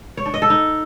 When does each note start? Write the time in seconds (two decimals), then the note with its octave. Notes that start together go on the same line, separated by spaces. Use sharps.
0.17 C#5
0.26 D4
0.34 D#5
0.42 A4
0.50 D#4